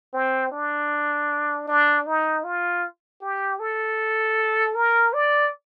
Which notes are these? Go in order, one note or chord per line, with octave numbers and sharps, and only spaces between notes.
C4
D4
D4
D#4
F4
G4
A4
A#4
D5